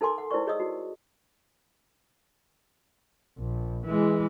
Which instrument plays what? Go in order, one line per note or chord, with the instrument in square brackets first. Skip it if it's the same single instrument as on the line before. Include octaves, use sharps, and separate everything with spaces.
[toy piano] D#4 A4 A#4 G#5 C6 D6
F#5
D#4 E4 A#4 C5 D5 C#6
G#4 C#5 D#5 D#6 E6
D#4 F#4
[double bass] A#1
E3 G#3